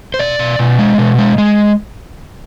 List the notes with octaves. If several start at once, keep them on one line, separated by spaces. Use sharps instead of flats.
C5
B2 D5
B2
B2
G#3
B2
G#3
G#3